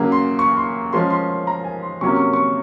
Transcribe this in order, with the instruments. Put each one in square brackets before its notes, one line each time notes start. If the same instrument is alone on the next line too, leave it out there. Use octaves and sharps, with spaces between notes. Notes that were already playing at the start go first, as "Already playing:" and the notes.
Already playing: [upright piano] C#3 F#3 A#3
C6
C#6
C6
F3 G#3 C#4 C6
C6
C6
A#5
G#5
C6
C3 F#3 A#3 C#4 C#6
C#6
C#6